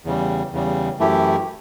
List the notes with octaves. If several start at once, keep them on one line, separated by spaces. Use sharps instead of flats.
E2 C#3 G3
E2 C#3 G3
F#2 E3 A3 E4 G4